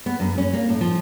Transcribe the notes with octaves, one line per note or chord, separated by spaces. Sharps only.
B3
F#2
C#4
A#3
A2
F3